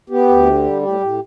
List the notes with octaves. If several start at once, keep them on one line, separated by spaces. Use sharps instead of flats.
B3 G4
D2
D3
G3
A2 G4
A2